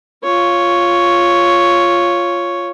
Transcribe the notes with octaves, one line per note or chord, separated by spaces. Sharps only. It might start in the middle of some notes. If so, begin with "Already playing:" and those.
F4 C#5